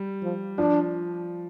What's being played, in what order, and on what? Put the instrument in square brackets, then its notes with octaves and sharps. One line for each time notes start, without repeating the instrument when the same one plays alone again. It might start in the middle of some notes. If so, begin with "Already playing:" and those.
Already playing: [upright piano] G3
[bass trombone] F3
[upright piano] F3 [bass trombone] D4